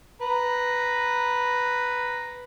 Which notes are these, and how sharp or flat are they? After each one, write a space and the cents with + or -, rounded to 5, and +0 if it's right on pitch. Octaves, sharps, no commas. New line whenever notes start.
B4 +0 A#5 +0